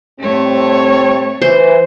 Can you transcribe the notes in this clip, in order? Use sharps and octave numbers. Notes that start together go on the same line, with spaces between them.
A2 G3 A3 C4 C#5
E3 C5